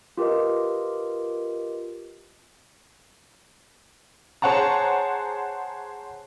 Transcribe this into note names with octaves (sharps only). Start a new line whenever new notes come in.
F4 G4 A#4 B4 D#5
G#4 C5 C#5 F#5 A5 A#5